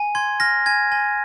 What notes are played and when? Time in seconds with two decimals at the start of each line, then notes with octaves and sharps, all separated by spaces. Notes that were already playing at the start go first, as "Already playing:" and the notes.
Already playing: G#5
0.15 C6 G#6
0.40 F6 A#6
0.66 G#5 G#6
0.92 G#5